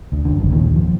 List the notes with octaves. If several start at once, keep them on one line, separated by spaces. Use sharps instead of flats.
D2
F#1 D3
A1 G2
D#2 A#2 D#3
F3